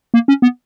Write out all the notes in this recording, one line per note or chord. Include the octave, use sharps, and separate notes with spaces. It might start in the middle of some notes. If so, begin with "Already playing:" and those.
A#3
C#4
B3